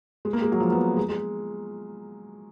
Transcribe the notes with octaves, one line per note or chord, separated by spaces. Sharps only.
G#3
A#3
G#3
F#3
F3
B3
G#3
G#3